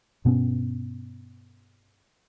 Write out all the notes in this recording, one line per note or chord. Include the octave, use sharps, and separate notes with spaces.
G2 B2 B3 C#4